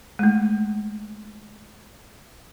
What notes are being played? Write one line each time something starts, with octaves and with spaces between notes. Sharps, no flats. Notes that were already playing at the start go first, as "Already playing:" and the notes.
G#3 A3